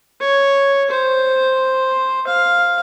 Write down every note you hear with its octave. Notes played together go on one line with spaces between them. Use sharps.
C#5
C5
F5